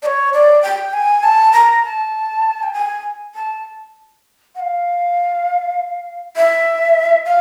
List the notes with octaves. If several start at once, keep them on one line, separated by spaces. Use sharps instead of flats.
D5
C#5
D5
G5
G#5
A5
A#5
A5
G5
G#5
A5
F#5
F5
E5
F5